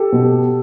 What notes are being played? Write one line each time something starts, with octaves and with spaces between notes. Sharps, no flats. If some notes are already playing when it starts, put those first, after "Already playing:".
Already playing: G4 A4
B2